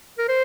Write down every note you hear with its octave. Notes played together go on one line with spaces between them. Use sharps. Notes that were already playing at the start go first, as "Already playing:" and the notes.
A#4
C5